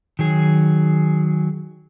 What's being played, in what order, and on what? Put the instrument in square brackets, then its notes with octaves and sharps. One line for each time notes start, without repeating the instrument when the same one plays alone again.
[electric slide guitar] D#3 F#3 G#4